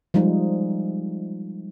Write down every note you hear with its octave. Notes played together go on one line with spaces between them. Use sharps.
F3 G3 G#3 D#4